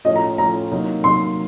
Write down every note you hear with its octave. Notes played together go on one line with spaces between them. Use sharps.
A2 F3 A3 C#4 D#5
A#5
A2 F3 A3 C#4 A#5
C3 F#3 A#3 D#4
C3 F#3 A#3 D#4 C6